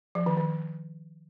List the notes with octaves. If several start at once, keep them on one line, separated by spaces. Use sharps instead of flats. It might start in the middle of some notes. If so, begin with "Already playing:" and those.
F3
D#3
D#3